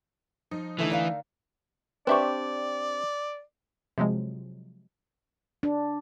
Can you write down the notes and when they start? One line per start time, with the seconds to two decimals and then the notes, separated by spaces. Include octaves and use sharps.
0.51 F3 D#4
0.79 D3 E3 A3 D#4
0.90 A#4 D5 F5
2.07 C4 D4 G4 B4 D5 E5 C#6
3.98 C3 F3 F#3 G#3
5.63 D4